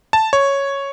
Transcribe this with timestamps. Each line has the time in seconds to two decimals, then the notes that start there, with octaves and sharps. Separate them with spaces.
0.13 A5
0.33 C#5